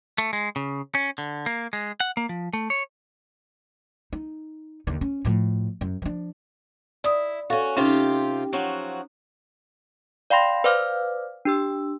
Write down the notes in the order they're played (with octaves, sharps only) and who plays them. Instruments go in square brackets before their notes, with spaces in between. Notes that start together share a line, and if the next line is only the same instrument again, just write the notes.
[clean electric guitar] A3
G#3
C#3
C#4
D3
A#3
G#3
F#5
A#3
F3
A3
C#5
[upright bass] D#4
D#2 D3
C#4
A2 F3
F#2
F3 D4
[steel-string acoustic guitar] E4 [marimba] D5 D#6
[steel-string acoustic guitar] C#4 F#4 [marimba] A4 F5
[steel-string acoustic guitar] C3 F4 G4 [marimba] C#4 D#4
[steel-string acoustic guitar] F3 F#3 F#4
[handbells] D5 F5 G5 B5 C6 A#6
B4 C5 D5 F5 D6 F6
D4 G4 E6